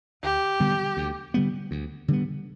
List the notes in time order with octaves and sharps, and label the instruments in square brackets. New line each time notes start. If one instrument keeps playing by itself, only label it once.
[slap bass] D2 [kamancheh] G4
[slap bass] D3 G3 B3
D2
D3 G3 B3
D2
D3 G3 B3